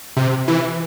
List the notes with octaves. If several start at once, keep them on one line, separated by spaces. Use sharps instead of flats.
C3
E3